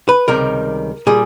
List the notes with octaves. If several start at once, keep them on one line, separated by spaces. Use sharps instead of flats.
B4
C#2 C3 D#3 G3 A#4
A#2 G3 G#4